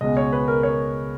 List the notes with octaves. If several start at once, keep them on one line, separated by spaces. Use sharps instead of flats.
C#2 B2 G#3 D#5
C#5
B4
A#4
C#5